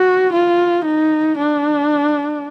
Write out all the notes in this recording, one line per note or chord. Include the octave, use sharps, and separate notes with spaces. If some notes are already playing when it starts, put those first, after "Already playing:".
Already playing: F#4
F4
D#4
D4